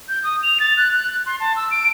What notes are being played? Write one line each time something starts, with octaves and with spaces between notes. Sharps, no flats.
G6
D#6
F7
A6
F#6
F#6
C6
A5
E6
D7